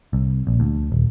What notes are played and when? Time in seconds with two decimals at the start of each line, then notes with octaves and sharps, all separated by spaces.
0.13 C2
0.47 A#1
0.60 D2
0.92 D#1